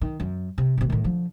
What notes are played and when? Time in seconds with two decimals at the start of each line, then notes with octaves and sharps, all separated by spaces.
0.02 D#3
0.20 F#2
0.58 C3
0.78 A1 C3
0.90 A2 D#3
1.04 D3 F3